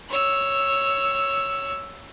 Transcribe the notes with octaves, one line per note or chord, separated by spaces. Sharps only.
C#5 E6